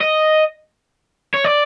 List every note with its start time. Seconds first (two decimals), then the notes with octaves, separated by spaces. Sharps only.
0.01 D#5
1.34 C#5
1.45 D5